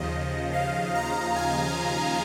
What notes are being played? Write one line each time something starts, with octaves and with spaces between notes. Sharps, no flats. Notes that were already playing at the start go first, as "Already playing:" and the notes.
Already playing: D#2 C#3 F3 D#5
F5
A#5
G#5